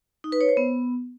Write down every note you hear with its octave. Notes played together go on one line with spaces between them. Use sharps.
D#4
B4
C#5
C5
B3